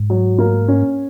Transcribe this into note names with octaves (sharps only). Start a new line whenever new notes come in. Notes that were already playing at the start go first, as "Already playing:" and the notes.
Already playing: G#2
F#3
A#3
C#4